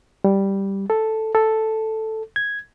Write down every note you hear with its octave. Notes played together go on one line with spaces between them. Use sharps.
G3
A4
A4
G#6